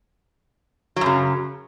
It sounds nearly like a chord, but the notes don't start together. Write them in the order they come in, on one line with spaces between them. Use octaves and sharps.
F#3 F#2 C#3